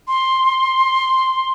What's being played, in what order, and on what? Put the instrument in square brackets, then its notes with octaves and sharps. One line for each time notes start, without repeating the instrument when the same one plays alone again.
[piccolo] C6